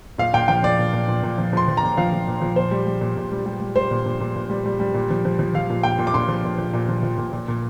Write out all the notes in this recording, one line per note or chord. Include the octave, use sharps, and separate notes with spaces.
A#2 F5
A#2 G5
F3 G5
F3 D5
A#2
A#2
A#2
A#2
F3
F3 C6
F3
A#5
A#2
F3 F5
F3
A#2
F3
A#2 C5
G3
G3
A#2
A#2
G3
G3
G3
G3 C5
A#2
A#2
A#2
A#2
G3
G3
G3
A#2
F3
F3
F3
F3 F5
A#2
A#2 G5
A#2
D6
A#2 C6
F3
A#2
F3
A#2
F3
F3
A#2
A#2
A#2